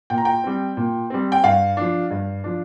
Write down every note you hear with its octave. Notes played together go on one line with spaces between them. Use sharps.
A#2 G5
A#5
G5
G3 C4
A#2
G3 C4
G5
G2 F5
F3 D4
G2
F3 D4